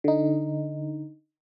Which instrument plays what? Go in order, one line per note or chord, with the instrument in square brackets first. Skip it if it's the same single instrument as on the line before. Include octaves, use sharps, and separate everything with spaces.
[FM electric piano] D3 D#4